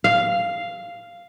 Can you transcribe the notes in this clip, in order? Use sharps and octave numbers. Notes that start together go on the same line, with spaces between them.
F5